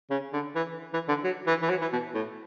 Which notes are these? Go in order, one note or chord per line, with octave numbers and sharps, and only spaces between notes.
C#3
D3
E3
E3
D3
F#3
E3
E3
F#3
E3
B2
A2